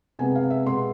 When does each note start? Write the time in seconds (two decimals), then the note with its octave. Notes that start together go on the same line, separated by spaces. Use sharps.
0.19 C3 G#3 B3 G#5
0.35 F5
0.50 E5
0.66 B2 G#3 B3 C6